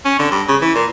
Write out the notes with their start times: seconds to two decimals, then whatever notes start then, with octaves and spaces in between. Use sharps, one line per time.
0.05 C#4
0.19 D3
0.31 G2
0.48 C#3
0.61 E3
0.75 A#2